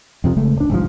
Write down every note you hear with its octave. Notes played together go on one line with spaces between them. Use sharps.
F2 C3 F3
F1 C#3 G#3 A3
D1 D4
G1 C2 G#2 F3